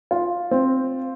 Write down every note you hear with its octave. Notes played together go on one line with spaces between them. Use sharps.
F4
C4